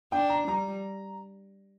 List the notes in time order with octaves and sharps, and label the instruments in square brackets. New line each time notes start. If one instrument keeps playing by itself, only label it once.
[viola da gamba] D4 [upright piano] G5
[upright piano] A#5
[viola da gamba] G3 [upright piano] A#5